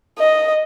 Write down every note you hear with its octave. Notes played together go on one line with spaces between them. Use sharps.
D#5